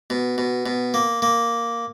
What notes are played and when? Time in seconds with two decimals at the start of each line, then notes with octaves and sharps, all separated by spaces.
0.10 B2
0.38 B2
0.66 B2
0.94 A#3
1.22 A#3